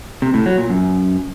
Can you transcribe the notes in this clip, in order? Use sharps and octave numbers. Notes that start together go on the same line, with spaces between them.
C3
A2
F#3
A#2
F#2